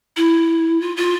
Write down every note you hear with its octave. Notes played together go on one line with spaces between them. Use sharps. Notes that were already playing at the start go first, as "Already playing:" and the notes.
E4
F4
F4